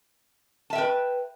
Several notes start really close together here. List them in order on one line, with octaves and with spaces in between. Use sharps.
A5 E5 G5 B4